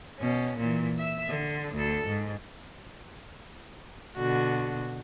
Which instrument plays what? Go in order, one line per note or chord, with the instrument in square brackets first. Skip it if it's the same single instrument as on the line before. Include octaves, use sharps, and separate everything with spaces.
[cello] B2 C#4
A#2 E3
E5
D3
D2 A4
G#2
[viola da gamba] B2 D3 F#4